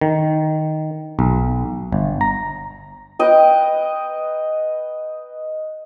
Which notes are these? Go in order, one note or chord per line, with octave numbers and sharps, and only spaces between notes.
D#3
B1
G1
A#5
B4 D#5 G5